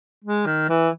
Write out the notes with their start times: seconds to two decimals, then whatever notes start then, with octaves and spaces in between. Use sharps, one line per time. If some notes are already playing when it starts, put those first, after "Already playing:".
0.24 G#3
0.46 D#3
0.69 E3